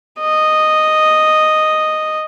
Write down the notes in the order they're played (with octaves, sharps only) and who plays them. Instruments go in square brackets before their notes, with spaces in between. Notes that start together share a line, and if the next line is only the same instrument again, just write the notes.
[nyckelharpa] D#5